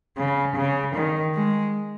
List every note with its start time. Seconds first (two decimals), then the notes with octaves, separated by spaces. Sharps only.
0.17 C#3
0.56 C#3
0.96 D#3
1.35 G#3